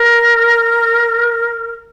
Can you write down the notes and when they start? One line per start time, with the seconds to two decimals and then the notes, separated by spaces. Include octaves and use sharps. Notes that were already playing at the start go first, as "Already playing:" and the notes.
Already playing: A#4